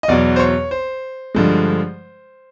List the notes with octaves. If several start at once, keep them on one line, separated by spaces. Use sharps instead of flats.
D#5
E2 B2 F#3 D5
C5
C#5
C5
G2 D3 F3 G#3